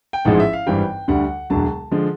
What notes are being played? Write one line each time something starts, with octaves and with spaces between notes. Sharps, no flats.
G5
A1 G#2 F3 G#3 F#5
E5
F5
G#1 G2 E3 G3 G5
D2 D3 G3 F#5
E1 D2 D3 F#3 A5
D3 F3 G#3